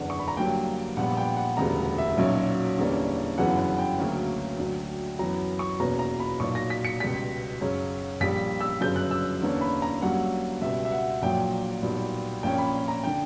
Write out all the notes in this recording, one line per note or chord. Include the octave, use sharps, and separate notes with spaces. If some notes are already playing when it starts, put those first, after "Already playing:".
Already playing: F#1 E2 D3 F#5
C#6
B5
A#5
G2 D3 F#3 A#3 G5
A#1 A#2 G3 B3 F#5
G5
F#5
E1 D2 C#3 G3 B3 A#5
E5
B1 A#2 F#3 C#4
E2 D3 G3 A#3 C#4
G1 F#2 C#3 E3 B3 F#5
F#5
G5
D2 C#3 F#3 A#3 C#4
D2 D3 F#3
F#2 E3 B3 A#5
C#6
E2 B2 A#3 C#4 A#5
A#5
B5
B1 A#2 F#3 C#6
A#6
B6
C#7
C#2 B2 G3 B6
F#2 C#3 F#3 C#4
A#1 A#2 G3 B6
E6
G1 F#2 C#3 G6
F#6
E6
E2 D3 A#3 C#4
B5
A#5
G2 F#3 A#3 C#4 F#5
C#2 B2 G3 E5
E5
F#5
A#1 A#2 F#3 A#3 G5
B1 A#2 G3 B3
A#1 A#2 A#3 C#4 G5
B5
A#5
D3 G5